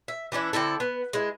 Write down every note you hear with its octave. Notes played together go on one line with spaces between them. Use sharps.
E5
E3 C#4 D4 E4
D3 C4 E4 A4
B3
G#3 E4